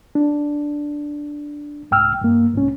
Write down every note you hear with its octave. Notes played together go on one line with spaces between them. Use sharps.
D4
C2 G#2 G5 E6 F6
G2 A#3
C2 G#2 C#4